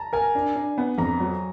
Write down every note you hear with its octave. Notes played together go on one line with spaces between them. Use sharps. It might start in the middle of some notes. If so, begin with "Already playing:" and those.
Already playing: A5 A#5
A#4 G#5
D4
D4
B3
F2 A#5
F#3